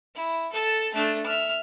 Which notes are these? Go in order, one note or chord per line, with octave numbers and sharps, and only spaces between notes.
E4
A4 A5
A3 D4
E5 F6